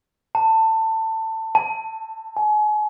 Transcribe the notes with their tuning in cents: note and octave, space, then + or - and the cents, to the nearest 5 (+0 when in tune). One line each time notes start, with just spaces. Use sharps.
A5 +20
A5 -5
G#5 +35